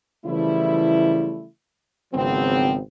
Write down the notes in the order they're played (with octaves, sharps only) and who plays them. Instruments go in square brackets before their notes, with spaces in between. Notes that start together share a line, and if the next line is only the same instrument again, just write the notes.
[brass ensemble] C#3 E3 F3 G3 A3 E4
G#1 C#3 F3 F#3 B3 C4